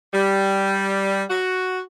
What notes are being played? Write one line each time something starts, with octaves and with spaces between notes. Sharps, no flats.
G3
F#4